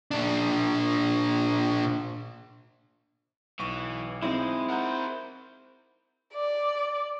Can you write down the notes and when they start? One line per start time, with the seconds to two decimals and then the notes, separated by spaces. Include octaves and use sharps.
0.11 A#2 D4
3.59 B1 E3 C#6
4.23 G#3 C4 D#4 E4
4.69 A#4 C5 F#5 A#5 G6
6.34 D5